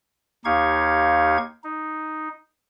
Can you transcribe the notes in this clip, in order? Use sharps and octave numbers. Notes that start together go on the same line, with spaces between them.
D#2 D#4 G4 F5 C#6 G#6
D#4